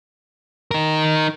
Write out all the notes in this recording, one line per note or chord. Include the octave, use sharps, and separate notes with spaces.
D#4 A#4